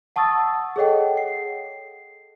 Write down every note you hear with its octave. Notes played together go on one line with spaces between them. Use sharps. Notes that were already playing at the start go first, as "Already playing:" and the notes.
F#5 A5 C#6 D#6 E6 A6
G#4 A4 C#5 D#5 F#5 G5
C7